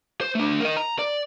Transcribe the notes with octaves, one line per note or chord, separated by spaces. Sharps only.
C5
A3 D4
A#4 D#5
A#5
D5